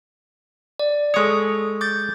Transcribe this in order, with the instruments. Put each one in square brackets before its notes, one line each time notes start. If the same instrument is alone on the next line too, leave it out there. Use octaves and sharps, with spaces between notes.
[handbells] D5
[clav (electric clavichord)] G#3 C#5 [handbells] A4 C#6 D#6
[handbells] D6 G6 A6